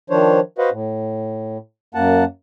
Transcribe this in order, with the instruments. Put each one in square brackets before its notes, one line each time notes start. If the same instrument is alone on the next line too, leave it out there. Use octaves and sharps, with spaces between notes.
[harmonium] D#3 F3 D4 C5 C#5
F#4 B4 C5 D#5 F5 F#5
A2
F#2 A#3 F#5 A5